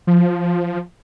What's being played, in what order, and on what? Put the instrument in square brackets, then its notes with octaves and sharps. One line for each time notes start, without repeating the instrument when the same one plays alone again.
[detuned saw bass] F3